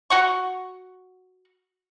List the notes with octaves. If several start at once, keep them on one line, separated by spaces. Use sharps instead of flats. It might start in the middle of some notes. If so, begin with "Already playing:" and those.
F#4 F#5 C#6